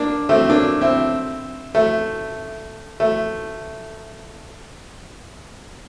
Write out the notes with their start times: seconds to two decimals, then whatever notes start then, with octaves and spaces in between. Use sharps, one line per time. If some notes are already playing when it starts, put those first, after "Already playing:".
Already playing: A#3 D4
0.29 A3 C4
0.50 A#3 D4
0.81 C4 E4
1.75 A3
3.00 A3